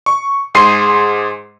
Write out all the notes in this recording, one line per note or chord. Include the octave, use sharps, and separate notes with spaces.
C#6
G#2 G#4 C6 C7 D#7